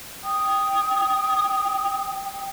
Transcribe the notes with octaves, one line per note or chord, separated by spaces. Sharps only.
G5 D#6